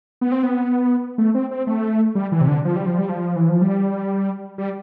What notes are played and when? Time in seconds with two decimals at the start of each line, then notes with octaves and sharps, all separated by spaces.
0.21 B3
0.32 C4
0.43 B3
1.18 A3
1.34 C4
1.51 C4
1.67 A3
2.15 G3
2.32 E3
2.41 C3
2.48 D3
2.65 F3
2.76 G3
2.86 F3
2.98 G3
3.09 F3
3.36 E3
3.49 F3
3.62 G3
4.58 G3